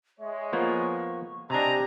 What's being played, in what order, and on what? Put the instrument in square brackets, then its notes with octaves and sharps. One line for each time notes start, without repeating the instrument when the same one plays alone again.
[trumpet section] G#3 C#5 [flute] E5
[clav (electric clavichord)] F3 A#3 B3 [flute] C#6
[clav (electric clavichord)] C3 D4 [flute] G4 [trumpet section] D#5 G#5 A#5